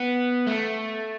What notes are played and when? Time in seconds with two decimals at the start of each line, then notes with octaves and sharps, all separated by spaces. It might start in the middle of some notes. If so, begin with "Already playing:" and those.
Already playing: B3
0.47 A3